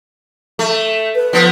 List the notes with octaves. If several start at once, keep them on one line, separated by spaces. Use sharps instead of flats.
A3
B4
F3 B3